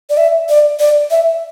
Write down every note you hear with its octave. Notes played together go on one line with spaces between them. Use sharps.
D5
E5
D5
D5
E5